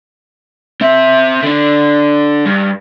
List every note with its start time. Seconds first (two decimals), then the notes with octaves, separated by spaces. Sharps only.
0.81 C4 E5
1.43 D3 D4
2.46 G2